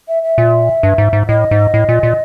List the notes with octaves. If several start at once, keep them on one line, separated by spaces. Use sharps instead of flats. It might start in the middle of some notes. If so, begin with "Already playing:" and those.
E5
E5
A#2
G2
G#2
G#2
A2 D#5
G#2
A2
A#2
A#2